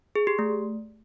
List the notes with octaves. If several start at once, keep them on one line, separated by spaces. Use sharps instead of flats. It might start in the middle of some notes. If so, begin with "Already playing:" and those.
G#4
G4
A3